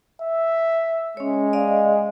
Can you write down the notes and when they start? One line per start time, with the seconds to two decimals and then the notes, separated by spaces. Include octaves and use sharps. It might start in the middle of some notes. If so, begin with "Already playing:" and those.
0.22 E5
1.17 G#3 C#4 C#5
1.53 D5 D#5 F5